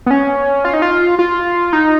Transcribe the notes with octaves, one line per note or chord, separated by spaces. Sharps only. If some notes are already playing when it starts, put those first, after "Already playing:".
B3
C#4
F4
D#4
F4
F4
D#4